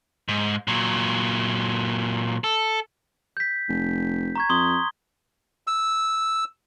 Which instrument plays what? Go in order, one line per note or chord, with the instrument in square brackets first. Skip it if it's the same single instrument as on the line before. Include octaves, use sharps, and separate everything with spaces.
[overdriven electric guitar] G#2
A#2 F#3
A4
[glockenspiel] G6 B6
[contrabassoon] F1
[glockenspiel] A#5 C#6 G#6
[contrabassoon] F2 [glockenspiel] C6 D#6 G7
[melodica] E6